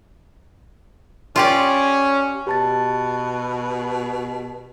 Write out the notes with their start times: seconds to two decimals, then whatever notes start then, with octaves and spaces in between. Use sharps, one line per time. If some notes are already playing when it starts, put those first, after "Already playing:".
1.36 C#4 F4 G4 D5
2.47 B2 G4 A5 A6